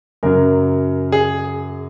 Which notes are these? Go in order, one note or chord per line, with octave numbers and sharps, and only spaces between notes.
F#2 C#3 F#3 A#4
G#4